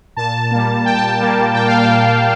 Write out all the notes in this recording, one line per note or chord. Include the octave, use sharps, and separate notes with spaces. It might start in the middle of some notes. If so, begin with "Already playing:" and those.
A#2 A5
G3 A#3
A#2 G5
A5
G5
G3 A#3
A#2 G5
F5
G5
G3 A#3